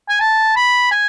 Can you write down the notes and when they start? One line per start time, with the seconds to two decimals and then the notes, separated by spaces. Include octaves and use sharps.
0.09 G#5
0.20 A5
0.56 B5
0.92 G#5